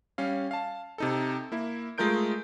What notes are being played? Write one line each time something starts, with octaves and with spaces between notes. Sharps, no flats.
G3 C#4 F5
F5 A5
C3 D#4 A4
A#3 E4
G#3 A3 F4 A#4 G6 D7